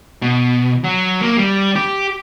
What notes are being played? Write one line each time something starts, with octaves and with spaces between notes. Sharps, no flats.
B2
F#3
A#3
G3
G4